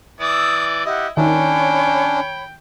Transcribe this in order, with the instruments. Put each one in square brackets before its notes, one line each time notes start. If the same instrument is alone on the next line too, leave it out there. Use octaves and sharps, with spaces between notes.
[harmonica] E3 D5 [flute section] D#6 E6
[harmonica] E4 D#5 [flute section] G4 F#5
[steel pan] D#3 [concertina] C#4 D4 [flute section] C#5 B5 [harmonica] G5